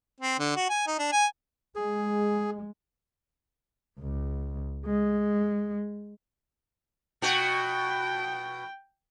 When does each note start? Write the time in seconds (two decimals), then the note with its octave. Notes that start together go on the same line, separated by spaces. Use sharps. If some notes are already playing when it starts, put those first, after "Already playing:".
0.20 C4
0.39 D3
0.56 F#4
0.70 G#5
0.87 D#4
0.99 D4
1.12 G#5
1.76 G#3 G#4
3.99 C#2
4.86 G#3
7.22 B2 F#4 G5